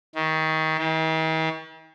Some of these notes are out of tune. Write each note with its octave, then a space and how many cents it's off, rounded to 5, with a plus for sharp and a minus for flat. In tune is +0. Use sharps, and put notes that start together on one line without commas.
D#3 +25
D#3 +45